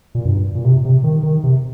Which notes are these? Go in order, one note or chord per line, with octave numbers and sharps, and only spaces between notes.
A#2
G2
A#2
C3
C3
D#3
D#3
C3